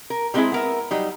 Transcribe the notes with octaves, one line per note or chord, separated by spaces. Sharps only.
A#4
G3 G#3 C4 C#4 E4 G#4
B3 A#4 E5
F#3 G3 D#4